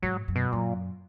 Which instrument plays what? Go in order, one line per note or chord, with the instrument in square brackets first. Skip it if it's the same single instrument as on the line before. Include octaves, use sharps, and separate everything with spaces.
[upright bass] G#2 [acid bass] F#3
[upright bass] F#2
[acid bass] B2
[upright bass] F#2 [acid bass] A#2